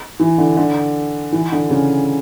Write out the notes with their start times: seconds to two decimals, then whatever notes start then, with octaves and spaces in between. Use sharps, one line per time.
0.20 E3
0.38 D3
0.57 D3
1.32 E3
1.52 D3
1.70 C#3